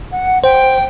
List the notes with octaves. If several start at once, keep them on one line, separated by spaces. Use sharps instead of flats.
F#5
C5 G5